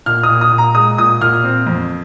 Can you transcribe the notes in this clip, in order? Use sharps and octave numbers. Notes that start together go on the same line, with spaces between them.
A#2 F6
D#6
A#2
D#6
A#2
A#5
G#3 D#6
A#2 D#6
A#2 F6
C4
F2